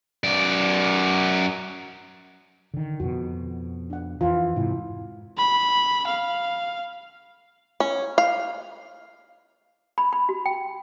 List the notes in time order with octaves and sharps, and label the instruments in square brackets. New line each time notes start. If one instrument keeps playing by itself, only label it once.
[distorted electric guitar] F#2 D5
[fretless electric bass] D3 D#3
[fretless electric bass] F2 B2 [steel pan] F#4
[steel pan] D4 F#5
[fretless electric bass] F2 E3 [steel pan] F4
[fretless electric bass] G#2 C3 [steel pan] E4
[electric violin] B5
F5
[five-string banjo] C#4
F5
[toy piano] B5
B5
F#4
G5